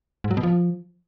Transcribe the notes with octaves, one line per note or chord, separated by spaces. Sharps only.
G#2
F#3
B2
F3